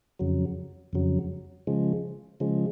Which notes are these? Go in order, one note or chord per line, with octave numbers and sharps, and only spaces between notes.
F2 C#3 F#3
F2 C#3 F#3
C#3 F3 G#3
C#3 F3 G#3